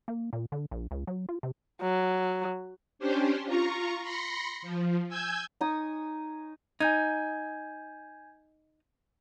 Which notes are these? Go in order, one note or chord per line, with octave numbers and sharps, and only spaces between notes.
A#3
A#2
D3
A#1
C#2
F#3
F4
C3
F#3
C#4 D4 G4 C5
F4 A#5 C#6
B5 C6 A#6 C#7
F3
G#5 E6 G6 G#6
D#4 G#5 C#6 D#6
D#4 G#5 G6 G#6